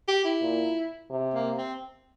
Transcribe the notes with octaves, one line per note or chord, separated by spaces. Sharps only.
G4
E4
A#2
C3
A#3
C4